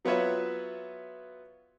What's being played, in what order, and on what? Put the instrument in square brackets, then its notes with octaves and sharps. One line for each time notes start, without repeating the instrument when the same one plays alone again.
[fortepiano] F#3 B3 F4 B4 C#5 E5